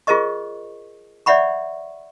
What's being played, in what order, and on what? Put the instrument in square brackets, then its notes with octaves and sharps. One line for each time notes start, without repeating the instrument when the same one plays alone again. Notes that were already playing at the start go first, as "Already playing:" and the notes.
[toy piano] F4 G#4 A#4 C5 D#5 C#6
C#5 D5 E5 F#5 B5 C#6